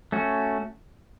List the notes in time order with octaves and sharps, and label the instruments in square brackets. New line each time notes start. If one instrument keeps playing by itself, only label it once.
[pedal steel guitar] A3 C#4 F#4